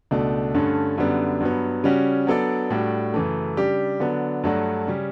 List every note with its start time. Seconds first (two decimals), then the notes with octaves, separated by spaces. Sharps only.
0.11 C#2 B2 A3 D4
0.54 G2 D3 A3 C#4
0.98 F#2 D3 G3 B3
1.41 G2 F#3 B3
1.84 C#3 G3 C#4 F#4
2.27 F#3 B3 D4 A4 D5
2.70 A2 G3 D4 F#4
3.14 F#2 C#3 E3 A3
3.57 C#3 G3 D4 G4
4.00 D3 F#3 B3 D4
4.43 G2 F#3 A3 D4 F#4
4.87 C#3 G3 C#4